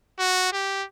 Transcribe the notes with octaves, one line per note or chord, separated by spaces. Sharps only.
F#4
G4